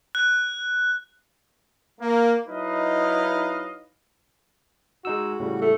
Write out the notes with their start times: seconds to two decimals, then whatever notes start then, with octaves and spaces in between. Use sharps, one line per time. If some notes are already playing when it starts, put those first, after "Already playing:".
0.15 F#6
2.01 A#3
2.48 F#3 D#4 E4 B4 D#5 F5
5.05 G#3 D#4 F#4 E6
5.40 A2 C#3 G3
5.62 A3